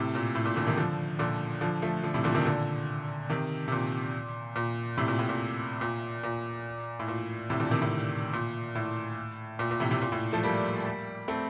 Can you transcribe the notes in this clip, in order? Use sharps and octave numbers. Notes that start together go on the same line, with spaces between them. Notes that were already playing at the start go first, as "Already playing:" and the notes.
Already playing: A2 C3
A#2
A2
A#2
A#2 D3
C3 D#3
D3 F3
A#2 D3
D3 F3
F3 A3
D3 F3
A2 C3
A#2 D3
C3 D#3
A#2 D3
C3 D#3
C3
A#2
A#2
A2 C3
A#2
A2
A#2
A#2
A#2
A2
A#2
A2 C3
A#2 D3
C3 D#3
A2 C3
A#2
A2
A#2
A#2
A2 C3
A2 C3
A#2
A2
F3 A3
G3 A#3
A3 C4